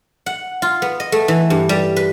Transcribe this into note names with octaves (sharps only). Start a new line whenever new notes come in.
F#5
F4
B3
D#5
A3
E3
G2
G3
B4